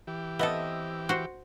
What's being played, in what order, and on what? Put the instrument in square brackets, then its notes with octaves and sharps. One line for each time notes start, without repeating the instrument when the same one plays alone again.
[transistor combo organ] E3 G4
[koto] B3 A4 [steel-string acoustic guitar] C4 D#5 E5
[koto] F#4 C5